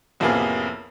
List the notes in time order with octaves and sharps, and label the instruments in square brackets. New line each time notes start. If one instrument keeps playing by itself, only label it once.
[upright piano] A1 F2 C3 A#3 B3 G#4